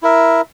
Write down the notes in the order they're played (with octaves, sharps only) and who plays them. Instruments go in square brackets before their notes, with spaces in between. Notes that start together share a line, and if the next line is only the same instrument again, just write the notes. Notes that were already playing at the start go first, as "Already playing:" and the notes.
[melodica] E4 A#4 E5